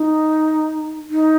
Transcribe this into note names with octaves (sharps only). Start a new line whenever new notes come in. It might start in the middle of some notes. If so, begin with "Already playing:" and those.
Already playing: D#4
D#4